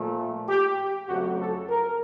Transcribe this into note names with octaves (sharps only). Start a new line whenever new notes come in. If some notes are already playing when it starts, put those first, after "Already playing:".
Already playing: A#2 F3 A3
G4
F2 C#3 F#3 A3 F#4
A4
A#4